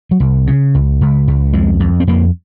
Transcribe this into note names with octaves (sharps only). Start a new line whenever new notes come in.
F#3
C2
C#3
C#2
C#2
C#2
F2 G#3
F2
C4
F2 A#3